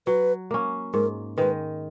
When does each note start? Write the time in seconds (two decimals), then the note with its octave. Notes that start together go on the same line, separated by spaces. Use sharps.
0.07 F#3 B4
0.51 A#3 C#4
0.93 G#2 A#4
1.37 D#3 G#3 B4